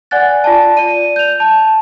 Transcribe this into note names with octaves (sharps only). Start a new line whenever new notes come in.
D5 F#5 G#5 F#6 A6
F4 D5 A5
D5 D#7
G6 F7
A5